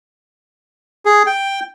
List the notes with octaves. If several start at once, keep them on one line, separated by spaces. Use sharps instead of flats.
G#4
G5